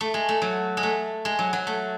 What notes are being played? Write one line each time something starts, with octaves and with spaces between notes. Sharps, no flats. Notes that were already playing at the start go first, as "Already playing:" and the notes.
A3
G#3
A3
F#3
G#3
A3
G#3
F#3
F#3
A3